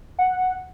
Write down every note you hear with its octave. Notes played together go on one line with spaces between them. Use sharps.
F#5